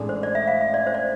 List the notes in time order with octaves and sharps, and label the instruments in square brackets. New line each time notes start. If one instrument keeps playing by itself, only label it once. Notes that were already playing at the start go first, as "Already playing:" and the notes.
Already playing: [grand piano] A1 A2 G#3 D4 G#4
[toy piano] C5
D5
E5
F5
E5
D5
C5
D5